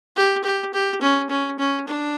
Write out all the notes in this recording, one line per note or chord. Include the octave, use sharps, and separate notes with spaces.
G4
G4
G4
C#4
C#4
C#4
D4